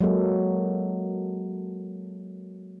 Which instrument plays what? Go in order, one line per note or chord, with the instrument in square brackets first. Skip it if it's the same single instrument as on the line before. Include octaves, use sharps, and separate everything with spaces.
[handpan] F#3 G#3 A#3 A4